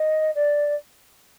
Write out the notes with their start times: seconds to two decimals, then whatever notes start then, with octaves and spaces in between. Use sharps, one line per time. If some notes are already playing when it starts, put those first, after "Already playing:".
Already playing: D#5
0.35 D5